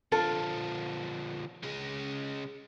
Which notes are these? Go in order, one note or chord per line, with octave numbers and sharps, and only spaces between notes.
D3 F3 F4 A4
C#3 G#3